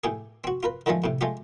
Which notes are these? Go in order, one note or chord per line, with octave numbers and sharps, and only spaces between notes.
A2 G4 G#4
C4 F#4
F4 A#4 B4
D3 D#3 F3 G#3 A3
A2 C3
G#3 A3 F4 G4